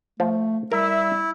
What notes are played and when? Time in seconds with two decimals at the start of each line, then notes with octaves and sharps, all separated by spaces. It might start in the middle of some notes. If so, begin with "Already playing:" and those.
0.20 F3 A3
0.72 G3 E4 A#4 E5